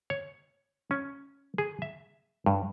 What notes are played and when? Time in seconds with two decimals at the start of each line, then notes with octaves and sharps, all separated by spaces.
0.10 C#5
0.91 C#4
1.58 G#4
1.82 E5
2.46 G2